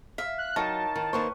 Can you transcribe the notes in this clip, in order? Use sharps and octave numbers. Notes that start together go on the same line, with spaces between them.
E5 F5
F#6
F#3 D#4 A#4 C#5 G5 A5
D#3
D#3 A#3 B4 C5 C#6